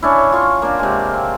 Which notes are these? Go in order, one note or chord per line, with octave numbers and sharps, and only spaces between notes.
C#4 D4 E4
F4 C#6
A#3 D4
C3 G#3
C4